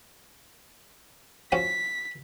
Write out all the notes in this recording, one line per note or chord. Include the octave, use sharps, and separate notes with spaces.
F3 C#4 F#4 B6